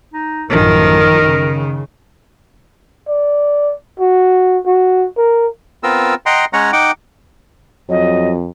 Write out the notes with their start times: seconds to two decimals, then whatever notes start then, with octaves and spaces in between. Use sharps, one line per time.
0.14 D#4
0.50 A1 F#2 D#3 F3 A#4
1.22 C#3
3.09 D5
4.00 F#4
4.66 F#4
5.17 A#4
5.83 B3 C4 F4 A#4 E6
6.26 D#5 F#5 G5 A#5 C6
6.53 G#3 C#4 C#5 F#5 A#5
6.73 D#4 F#5 G5 D6
7.89 F2 F#3 D#5